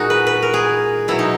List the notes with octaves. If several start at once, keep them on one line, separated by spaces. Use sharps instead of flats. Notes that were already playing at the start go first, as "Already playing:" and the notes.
Already playing: A#2 G#3 D#4 F#4
B4
B4
A#4
G#4
B2 F#3 E4
D#4